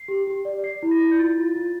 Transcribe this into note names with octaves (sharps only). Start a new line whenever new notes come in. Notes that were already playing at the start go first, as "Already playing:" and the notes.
Already playing: C7
G4
G4
D5
D5 C7
E4
A#6
E4
G6
F4 A6
F4
F4